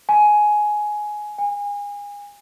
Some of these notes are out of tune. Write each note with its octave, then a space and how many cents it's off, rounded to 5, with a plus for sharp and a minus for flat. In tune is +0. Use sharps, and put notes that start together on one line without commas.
G#5 +10
G#5 -30